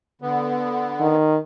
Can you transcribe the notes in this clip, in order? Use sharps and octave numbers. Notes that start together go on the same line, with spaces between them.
D3 B3
D#3